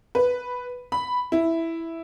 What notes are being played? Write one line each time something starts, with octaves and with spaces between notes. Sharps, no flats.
B4
B5
E4